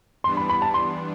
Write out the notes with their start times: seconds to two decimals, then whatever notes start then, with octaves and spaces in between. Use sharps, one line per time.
0.24 E3 G3 B3 D4 C6
0.37 B5
0.49 B5
0.62 A5
0.74 C6